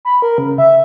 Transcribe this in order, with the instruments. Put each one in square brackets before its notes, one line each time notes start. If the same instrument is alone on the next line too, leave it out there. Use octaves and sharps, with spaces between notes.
[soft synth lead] B5
A#4
C#3
E5